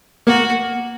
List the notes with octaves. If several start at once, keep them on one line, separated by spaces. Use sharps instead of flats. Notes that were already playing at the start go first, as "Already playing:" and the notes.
A#3 F#4